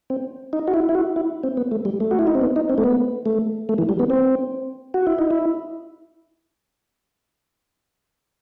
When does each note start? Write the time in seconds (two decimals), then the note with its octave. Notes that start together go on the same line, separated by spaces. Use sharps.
0.10 C4
0.53 D#4
0.68 F#4
0.74 E4
0.89 E4
0.95 F#4
1.16 E4
1.43 C4
1.57 B3
1.71 A3
1.85 G3
2.00 A3
2.11 F#4
2.19 E4
2.27 D#4
2.35 C4
2.41 B3
2.56 D#4
2.69 C4
2.78 A3
2.84 B3
3.26 A3
3.69 A3
3.78 E3
3.89 G3
3.99 B3
4.10 C4
4.94 F#4
5.07 E4
5.19 D#4
5.31 E4